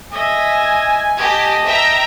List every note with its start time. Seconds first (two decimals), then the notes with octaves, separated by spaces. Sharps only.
0.13 D#5 E5 G#5
1.19 G4 D#5 A5
1.65 E5 G5 A#5